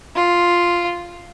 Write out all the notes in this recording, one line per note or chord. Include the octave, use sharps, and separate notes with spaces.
F4